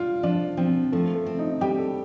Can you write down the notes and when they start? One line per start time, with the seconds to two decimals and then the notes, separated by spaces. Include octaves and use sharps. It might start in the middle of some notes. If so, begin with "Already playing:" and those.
Already playing: G3 F4
0.23 F3 D4
0.57 F3 C4
0.92 F3 A3
1.15 A3
1.26 C4
1.39 D#4
1.61 G3 G4
1.78 A4